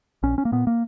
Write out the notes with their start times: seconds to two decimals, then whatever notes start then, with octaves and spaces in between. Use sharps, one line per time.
0.23 A#1 C#4
0.38 C#4
0.45 A#3
0.52 A#2 B3
0.67 A#3